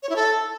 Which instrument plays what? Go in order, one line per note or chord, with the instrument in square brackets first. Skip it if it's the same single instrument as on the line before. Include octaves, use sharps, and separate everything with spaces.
[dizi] C#5
E4
A4